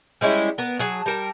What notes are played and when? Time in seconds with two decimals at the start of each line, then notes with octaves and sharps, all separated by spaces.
0.21 G3 G#3 C#4 E4
0.58 B3 A#4
0.79 F#3 G#4 A5
1.06 G3 A#4 A5